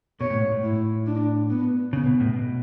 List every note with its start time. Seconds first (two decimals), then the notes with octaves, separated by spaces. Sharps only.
0.20 B2 C#5
0.30 A2
0.41 G#2
0.52 A2
0.63 E4
1.07 D4
1.50 B3
1.93 C#3 B3
2.06 B2
2.20 A2
2.33 B2